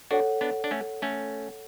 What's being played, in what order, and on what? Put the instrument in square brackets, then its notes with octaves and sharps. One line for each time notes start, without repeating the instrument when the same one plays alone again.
[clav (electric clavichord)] D4 F#4 [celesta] A4 C#5 F#5
[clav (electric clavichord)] B3 D4
D4
A3 C#4
A3 C#4